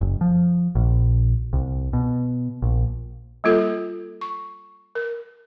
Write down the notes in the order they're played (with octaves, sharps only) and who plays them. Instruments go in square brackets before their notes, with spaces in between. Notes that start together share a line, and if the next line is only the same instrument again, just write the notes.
[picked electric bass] F#1
F3
A#1
C2
B2
A#1
[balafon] G3 A#3 F4 A4
C#6
A#4